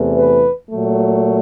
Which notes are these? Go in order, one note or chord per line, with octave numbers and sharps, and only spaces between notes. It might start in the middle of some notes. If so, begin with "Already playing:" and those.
Already playing: E2 C3 E3 A3
B4
A#2 F#3 A3